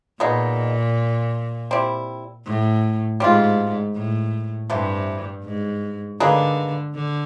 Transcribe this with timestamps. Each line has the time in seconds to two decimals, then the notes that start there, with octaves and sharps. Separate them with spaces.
0.20 A#2 G#3 B3 D#4
1.71 G3 C4 E4
2.45 A2
3.20 G#2 G3 C4 F4
3.95 A2
4.70 G2 C3 E3 A3 C4
5.45 G#2
6.20 D3 A#3 D#4 G#4 B4
6.95 D3